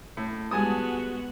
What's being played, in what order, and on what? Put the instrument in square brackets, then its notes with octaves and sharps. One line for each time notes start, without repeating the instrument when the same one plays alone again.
[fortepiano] A2
[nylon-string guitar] G3 G#3 [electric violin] B3 F#4 [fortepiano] G#5 A5 D#6